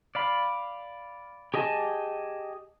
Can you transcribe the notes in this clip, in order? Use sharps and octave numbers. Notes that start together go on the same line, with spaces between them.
D5 F5 B5
G4 G#4 D#5 G#5 A5